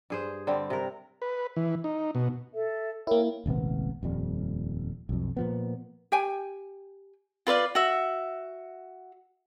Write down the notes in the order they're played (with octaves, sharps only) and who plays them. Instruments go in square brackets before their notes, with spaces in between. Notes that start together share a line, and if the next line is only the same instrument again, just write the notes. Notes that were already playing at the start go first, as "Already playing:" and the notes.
[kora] G2 G#4 C5
D3 G3 C4
C3 A#4
[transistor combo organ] B4
E3
D#4
B2
[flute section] A4 E5
[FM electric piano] A#3 E4 [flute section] A#4 C#5 G5
[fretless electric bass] D#1 G#1 C3 B3
D#1 F2 G3
B1 F2
A#2 F3 B3
[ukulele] G4 G5 G#5
[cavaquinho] F4 B4 D5 F5
F#4 E5